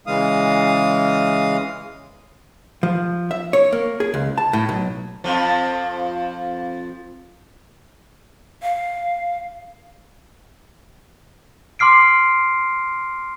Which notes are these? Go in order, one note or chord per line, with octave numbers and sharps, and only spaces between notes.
C#3 E3 G#3 F5 D#6
F3
E5
C#5
A#3
G#4
C#2
A5
A2
B1
F2 F3
F5
C6 D6 F6 C7 D7